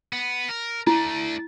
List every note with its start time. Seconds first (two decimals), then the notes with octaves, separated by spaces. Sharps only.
0.13 B3
0.49 A#4
0.87 A3 D4 E4